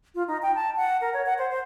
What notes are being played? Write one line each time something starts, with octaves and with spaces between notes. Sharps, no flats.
F4
D#4
G5
A5
F#5
A#4
C#5
F#5
C5
C5